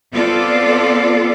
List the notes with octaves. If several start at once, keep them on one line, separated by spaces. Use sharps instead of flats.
B3 C4 F4 A4 D5